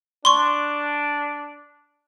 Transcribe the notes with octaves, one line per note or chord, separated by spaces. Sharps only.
D4 C6 C#6